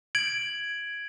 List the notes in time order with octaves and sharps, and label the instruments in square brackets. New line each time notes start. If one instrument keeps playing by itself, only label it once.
[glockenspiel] G#6 D7 F#7